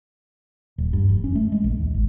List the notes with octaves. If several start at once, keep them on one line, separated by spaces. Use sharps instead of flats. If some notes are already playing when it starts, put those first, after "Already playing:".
D#1
G2
F1
C#4
A3
G#3
A#1
D#2
G#1